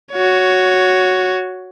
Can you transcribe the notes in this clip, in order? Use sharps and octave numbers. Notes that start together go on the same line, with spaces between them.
F#4 C#5